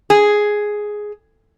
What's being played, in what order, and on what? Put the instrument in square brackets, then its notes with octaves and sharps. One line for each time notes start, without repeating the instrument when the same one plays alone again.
[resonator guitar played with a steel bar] G#4